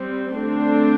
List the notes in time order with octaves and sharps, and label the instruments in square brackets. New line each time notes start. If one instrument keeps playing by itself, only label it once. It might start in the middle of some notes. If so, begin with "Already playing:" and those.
Already playing: [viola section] G3 C4
D3 A3 C4 D4